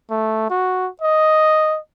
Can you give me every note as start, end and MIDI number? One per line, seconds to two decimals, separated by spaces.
0.10 0.47 57
0.50 0.88 66
1.02 1.78 75